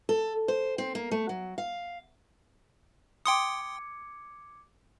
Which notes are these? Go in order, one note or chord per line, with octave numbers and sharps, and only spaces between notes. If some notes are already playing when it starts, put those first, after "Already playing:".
A4
C5
C4
A#3
A3
F#3
F5
G5 C6 D6 D#6 G#6 C#7